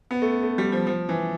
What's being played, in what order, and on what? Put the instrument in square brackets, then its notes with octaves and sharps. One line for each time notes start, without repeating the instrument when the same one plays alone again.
[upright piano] B3
A3
A3
G3
F3
F3
E3